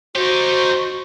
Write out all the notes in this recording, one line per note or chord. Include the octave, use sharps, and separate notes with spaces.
D#4 F#4 G4 C5